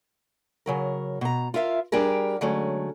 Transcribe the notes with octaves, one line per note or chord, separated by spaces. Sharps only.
C#3 F#3 A#4
B2 A#5
F4 A#4 E5 F5
G3 D4 G4 G#4 A#4
D3 F#3 G#3 A3 C#4